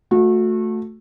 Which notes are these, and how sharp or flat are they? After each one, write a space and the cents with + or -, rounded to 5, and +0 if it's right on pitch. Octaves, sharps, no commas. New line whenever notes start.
A3 +0 F#4 -30